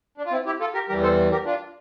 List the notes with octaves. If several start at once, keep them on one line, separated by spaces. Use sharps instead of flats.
D4
F4
C4 E4
E4 G4
F4 A4
G4 A#4
E2 E3 G3 G4 A#4
A4 C5
G4 A#4
D4 F4